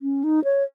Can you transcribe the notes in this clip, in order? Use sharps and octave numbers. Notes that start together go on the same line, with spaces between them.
C#4
D#4
C#5